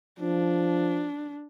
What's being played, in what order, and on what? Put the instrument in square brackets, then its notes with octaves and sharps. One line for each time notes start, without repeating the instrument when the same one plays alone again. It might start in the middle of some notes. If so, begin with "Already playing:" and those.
[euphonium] F3 [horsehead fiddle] D4